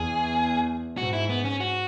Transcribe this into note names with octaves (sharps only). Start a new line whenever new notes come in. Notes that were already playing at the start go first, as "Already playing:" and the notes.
Already playing: E2 G#4
G#2 F#4
E4
B3
C#4
F#4